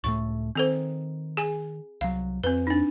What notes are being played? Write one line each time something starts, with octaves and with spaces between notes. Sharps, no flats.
C#2 A2 A3 C#6
D#3 C4 A4 C5
G#4 G#5
C2 F#3 F5
F2 C4 B4
D4 D#4